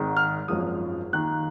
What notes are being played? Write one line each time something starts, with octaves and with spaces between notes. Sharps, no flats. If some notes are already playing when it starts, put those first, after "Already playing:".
Already playing: G#1 G#2 D#3 G#3
F6
G#1 F#2 F3 G#3 D#6
D#2 D#3 A#3 F#6